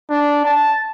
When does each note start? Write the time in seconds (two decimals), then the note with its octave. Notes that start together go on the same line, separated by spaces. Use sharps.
0.10 D4
0.45 A5